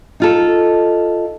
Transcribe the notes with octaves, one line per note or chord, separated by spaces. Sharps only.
D#4 F4 A4